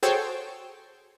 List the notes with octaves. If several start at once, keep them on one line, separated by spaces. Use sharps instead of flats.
F#4 G#4 A4 C5 C#5 G5